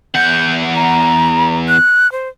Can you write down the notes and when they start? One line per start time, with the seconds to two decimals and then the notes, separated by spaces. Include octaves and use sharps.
0.15 E2 F#5 G6
0.75 A#5
1.68 F#6
2.12 C5